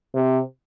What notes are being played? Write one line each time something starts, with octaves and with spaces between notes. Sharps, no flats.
C3